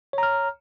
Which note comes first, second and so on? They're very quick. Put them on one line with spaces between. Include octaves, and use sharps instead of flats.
C#5 A#5 F6